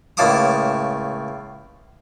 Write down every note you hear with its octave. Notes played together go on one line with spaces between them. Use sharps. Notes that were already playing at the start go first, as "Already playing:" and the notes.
C#2 A2 A#3 A5 D6 D#6